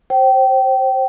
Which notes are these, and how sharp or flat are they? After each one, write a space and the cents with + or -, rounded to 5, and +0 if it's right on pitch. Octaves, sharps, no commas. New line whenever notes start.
C5 +15 G5 -25